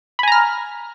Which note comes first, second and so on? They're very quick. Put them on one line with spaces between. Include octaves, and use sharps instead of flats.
B5 G#5 A#5 F6